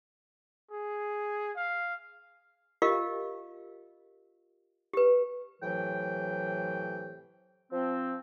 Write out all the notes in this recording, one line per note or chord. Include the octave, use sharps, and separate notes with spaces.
G#4
F5
F4 G4 A#4 D#5 F5
G4 B4
A2 C3 E3 F#3 G5
F3 C4